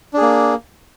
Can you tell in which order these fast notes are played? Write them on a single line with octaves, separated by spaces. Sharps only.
D4 G#4 A#3